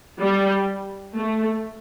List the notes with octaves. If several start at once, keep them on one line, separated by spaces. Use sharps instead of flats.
G3
A3